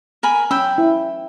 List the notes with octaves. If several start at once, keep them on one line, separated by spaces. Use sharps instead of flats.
A#4 G#5 B5
C#4 G5 B5 E6
E4